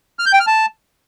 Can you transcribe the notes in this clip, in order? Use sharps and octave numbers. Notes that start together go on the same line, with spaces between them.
F6
G6
G5
F6
A5